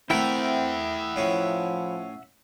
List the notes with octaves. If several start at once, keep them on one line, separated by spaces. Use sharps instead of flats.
A3 C4 E4 A#4 E5 F#5 G5
A2 F3 C#4